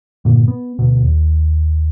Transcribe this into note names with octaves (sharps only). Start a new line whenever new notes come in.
G2 A#2 D3
B3
D2 B2
D#2